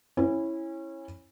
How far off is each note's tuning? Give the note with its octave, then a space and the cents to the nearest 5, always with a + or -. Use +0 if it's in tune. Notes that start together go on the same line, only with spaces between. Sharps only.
C#4 -25 E4 +0